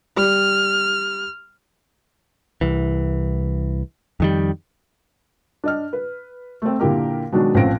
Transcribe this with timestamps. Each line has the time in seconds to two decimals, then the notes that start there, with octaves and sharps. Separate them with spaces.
0.17 G3 F6
2.61 C2 E3
4.20 F2 D#3 G3
5.64 D4 D#5 F6
5.93 B4
6.62 A3 C4
6.80 A#2 D3 E4 G4 A#4
7.32 B2 D#3 F#3 G#3 D4
7.54 D#1 A1 F3 C4 A#6 D7